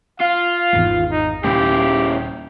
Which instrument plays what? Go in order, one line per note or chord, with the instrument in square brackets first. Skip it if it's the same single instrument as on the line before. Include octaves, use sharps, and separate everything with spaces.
[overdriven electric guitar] F4 [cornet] F5
[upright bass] G#1 E2
[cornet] D#4
[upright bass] D#1 [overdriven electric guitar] C#3 E4 [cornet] G4